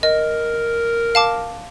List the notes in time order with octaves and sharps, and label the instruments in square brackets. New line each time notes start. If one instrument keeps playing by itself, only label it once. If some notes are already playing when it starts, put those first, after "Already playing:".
[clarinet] A#4 [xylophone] D#5
[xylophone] F5 A5 D6